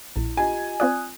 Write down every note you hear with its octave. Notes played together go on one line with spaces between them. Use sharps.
A#1 E4
F4 G4 D#5 G#5
C4 F4 D5 D#6 F#6